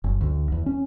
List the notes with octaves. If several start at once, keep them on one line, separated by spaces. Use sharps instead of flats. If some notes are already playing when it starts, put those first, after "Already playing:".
F#1
D2
E2
C#4